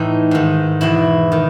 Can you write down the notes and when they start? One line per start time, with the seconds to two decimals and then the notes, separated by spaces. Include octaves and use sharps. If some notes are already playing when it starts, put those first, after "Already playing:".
Already playing: A2 E3 D#4
0.31 G#2 D#3
0.81 E2 B2 E4
1.32 D#3